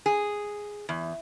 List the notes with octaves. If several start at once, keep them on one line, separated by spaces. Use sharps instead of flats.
G#4
E2